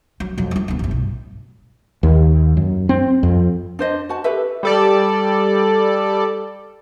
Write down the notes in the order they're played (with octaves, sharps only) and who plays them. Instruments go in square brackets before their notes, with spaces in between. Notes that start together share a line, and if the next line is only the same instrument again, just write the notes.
[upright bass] F#3
F2 F#3
F#3 F4
D2 B3
G1 A2
B1
[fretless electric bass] D#2
F#2
C4
F2
[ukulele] D4 C5 D#5
F#4 A5
G4 A4 B4 E5
[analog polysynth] G3 A4 D5